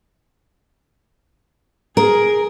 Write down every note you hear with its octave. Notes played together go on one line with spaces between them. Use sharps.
G#4 A#4